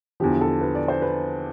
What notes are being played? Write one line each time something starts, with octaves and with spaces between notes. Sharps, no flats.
E2 D3 F3 G4
A4
B4
D5
C5
B4